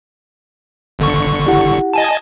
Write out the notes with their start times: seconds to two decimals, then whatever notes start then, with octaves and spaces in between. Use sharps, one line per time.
0.99 G1 D3 C#6
1.46 E4 G4 F#5
1.93 D#5 G#5 A5